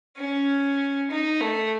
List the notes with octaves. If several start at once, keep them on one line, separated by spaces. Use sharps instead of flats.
C#4
D#4
A3